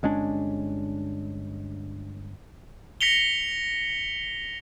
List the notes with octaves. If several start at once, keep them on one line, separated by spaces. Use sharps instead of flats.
G1 G#3 C#4 D4
A#6 B6 C#7 F7 G7